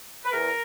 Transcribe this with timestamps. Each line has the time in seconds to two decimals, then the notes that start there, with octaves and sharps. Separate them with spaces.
0.24 B4
0.32 E2 A#4